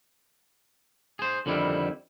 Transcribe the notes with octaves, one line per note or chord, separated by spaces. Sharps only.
G#4 C5
F2 D3 D#3 G3 E4